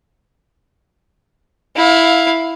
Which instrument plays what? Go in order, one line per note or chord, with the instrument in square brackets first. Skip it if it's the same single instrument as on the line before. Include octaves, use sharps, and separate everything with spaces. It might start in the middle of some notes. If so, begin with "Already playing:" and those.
[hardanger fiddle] E4 F5